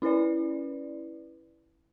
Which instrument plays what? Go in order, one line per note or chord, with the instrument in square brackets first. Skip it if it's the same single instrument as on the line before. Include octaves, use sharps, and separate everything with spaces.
[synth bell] C#4 E4 B4 D5